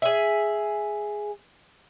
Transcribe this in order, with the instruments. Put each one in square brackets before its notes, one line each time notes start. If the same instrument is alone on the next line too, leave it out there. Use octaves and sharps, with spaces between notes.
[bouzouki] G#4 E5